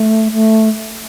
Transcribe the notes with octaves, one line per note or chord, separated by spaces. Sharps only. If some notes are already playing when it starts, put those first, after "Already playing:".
Already playing: A3
A3